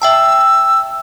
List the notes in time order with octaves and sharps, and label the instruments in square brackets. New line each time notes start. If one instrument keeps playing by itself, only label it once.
[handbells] E5 G5 A5 [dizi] E6